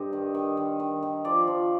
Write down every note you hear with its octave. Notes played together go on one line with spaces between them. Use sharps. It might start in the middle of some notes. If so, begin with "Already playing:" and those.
Already playing: G2 C5 D#5
D#3
D#3
D#3
D#3
D#3
F3 D5
F3